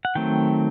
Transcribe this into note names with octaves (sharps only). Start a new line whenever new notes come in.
F#5
D#3 F#3 A3 C4 G5